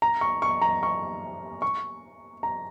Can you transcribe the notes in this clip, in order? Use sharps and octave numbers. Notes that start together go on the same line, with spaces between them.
A#5
C#6
C#6
A#5
C#6
C#6
A#5